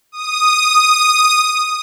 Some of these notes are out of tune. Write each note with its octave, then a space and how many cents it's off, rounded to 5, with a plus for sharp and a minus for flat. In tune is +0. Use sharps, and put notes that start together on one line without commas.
D#6 -5